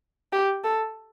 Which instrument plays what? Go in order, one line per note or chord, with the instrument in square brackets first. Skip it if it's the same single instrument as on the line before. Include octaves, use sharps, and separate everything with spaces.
[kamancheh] G4
A4